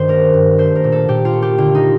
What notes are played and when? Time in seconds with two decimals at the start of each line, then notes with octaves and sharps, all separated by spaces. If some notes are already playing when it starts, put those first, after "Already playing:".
Already playing: G2 D#3 C5
0.08 A#3 A#4
0.34 G2
0.58 A3 C5
0.75 A#4
0.84 A#2
0.92 A4
1.08 A#2 G4
1.25 F4
1.33 A3
1.42 G4
1.58 D3 F4
1.75 D#4